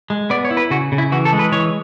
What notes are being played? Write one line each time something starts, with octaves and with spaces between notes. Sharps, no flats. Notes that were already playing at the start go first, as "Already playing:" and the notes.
G#3
B3 D5
C#5
E4
B4
C#3 F#4
C#3
E4
E3 F#4
A4
G#3
B4
E3 C#5